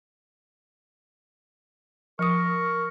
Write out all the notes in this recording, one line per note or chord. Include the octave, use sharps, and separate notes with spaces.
F3 A#4 C#6 D#6